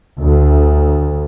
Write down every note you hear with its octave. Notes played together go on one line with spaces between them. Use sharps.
D2